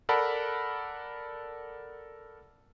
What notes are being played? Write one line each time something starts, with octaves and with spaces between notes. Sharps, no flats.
A4 A#4 D5 F#5 A5 B5